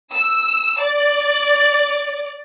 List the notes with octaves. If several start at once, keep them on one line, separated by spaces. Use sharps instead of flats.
E6
D5